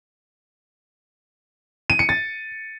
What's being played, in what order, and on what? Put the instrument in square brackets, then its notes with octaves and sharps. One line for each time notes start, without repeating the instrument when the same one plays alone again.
[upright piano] D#7
C#7
A6